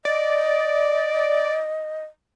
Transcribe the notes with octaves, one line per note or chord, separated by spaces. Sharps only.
D5 D#5